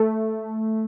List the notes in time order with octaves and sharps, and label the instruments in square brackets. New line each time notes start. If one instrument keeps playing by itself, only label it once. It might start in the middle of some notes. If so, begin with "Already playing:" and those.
Already playing: [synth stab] A3